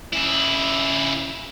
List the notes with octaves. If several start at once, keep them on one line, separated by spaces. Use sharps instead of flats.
C#3 E4